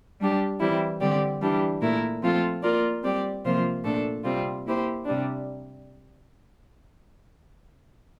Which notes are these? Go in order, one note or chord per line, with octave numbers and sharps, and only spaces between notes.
G3 D4 G4
E3 G3 C4 E4
D3 G3 C4 G4 D5
E3 G3 D4 G4
A#2 A3 E4 A#4
F3 A3 C4 F4 A4
A#3 F4 A#4 D5
G3 C4 G4 D5
C3 F3 A#3 F4 C5
A#2 A3 D4 A4
C3 G3 C4 F4
A#3 E4 G4 C5
C3 G3 D4